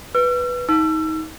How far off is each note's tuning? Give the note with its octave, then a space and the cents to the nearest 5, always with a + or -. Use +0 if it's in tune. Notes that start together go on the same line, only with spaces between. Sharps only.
B4 +0 E6 +45
D#4 +30 E6 +35